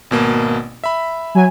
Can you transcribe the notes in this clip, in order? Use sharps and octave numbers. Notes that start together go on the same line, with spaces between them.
G#1 B2 A#3
E5 B5
F#3 G#5